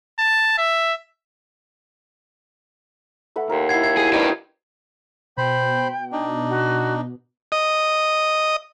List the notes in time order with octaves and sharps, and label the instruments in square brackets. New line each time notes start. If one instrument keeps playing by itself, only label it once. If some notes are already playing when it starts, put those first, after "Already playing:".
[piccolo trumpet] A5
E5
[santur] A3 B4 F#5
[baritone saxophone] D#2 [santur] A#4 C6
[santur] E4 B4 F#5 [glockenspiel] G#6 C7
[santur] E5 [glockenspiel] G#6
[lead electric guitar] G#4
[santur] D#4 D5 C6 [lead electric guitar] G4 B4
[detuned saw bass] B2 [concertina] C5 B5 [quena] G5
[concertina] D4 D#4
[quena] F#4
[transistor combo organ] D#5